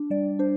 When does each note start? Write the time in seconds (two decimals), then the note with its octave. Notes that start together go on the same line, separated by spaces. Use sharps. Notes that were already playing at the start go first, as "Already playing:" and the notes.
Already playing: D4
0.10 G3 D5
0.39 D4 C5